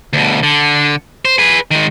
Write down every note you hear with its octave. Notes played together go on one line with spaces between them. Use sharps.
D2 B2
D3
C5
G#4 B4
D#3 G#3